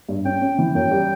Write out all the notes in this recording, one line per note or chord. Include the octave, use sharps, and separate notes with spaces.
G2
C#4 G5
C#4
E3
F#2 G5
G3